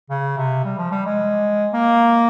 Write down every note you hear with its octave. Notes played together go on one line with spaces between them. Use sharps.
C#3
C3
G3
F3
G3
G#3
A#3